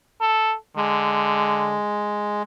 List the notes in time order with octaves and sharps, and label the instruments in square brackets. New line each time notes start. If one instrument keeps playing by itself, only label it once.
[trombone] A4
[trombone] D3 [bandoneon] G#3